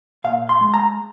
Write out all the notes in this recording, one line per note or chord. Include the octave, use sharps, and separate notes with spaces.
A#2 F5
C6
G#3
A#5